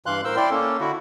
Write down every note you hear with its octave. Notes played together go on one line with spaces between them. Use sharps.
G2 E3 F5 C6 F#6
A2 A#4 C5 C6 E6
E4 D5 G5 C6
A#3 C#4 A4
D3 E4 F#4